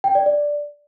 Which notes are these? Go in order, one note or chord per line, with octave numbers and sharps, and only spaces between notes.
G5
D5
D5